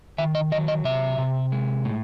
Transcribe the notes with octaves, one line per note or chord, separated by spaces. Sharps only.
D#3 E5
D#5
F#3 D#5
D#5
C3 E5
C3
G#3
A2